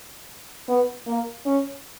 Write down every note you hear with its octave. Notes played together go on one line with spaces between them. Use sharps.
B3
A#3
C#4